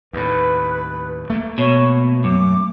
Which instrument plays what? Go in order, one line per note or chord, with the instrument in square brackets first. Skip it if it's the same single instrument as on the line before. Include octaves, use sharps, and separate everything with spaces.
[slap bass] D#2 A2 [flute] B4
[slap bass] A3 A#3
[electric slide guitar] B2 [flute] C#5
[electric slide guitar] F#2 [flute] D6